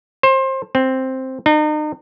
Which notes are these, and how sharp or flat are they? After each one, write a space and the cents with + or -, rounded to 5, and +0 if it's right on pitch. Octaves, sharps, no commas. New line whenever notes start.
C5 +25
C4 +5
D#4 -40